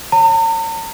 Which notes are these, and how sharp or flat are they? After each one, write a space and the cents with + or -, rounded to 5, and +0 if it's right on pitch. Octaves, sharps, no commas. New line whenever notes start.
C#5 +0 A#5 -45